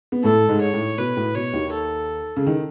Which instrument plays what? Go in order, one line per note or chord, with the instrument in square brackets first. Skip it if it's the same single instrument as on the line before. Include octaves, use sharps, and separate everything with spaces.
[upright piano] B3
[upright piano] A2 A3 [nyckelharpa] A4
[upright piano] G#2 G#3
[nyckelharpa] C#5
[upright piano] A2
[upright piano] B2 [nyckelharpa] B4
[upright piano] A2
[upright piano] B2 [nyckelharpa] C#5
[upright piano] D#2 D#3
[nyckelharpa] A4
[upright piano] C#3
D#3